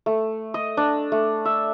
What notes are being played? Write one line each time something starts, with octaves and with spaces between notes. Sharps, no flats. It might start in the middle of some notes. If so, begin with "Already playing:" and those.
A3
D#5
D4
A3
E5